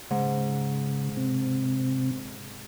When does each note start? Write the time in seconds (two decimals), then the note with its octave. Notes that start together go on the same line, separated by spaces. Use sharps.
0.11 G#2 C#3
1.17 C3 C4